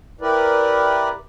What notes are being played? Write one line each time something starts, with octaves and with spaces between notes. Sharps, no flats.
E4 G4 A#4 B4 D5